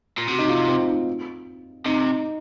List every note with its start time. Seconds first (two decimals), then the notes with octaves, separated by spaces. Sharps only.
0.18 A#2
0.28 C3 F#4
0.39 D#4
0.48 F4
0.68 C4
0.88 D#4
1.85 C3 D#4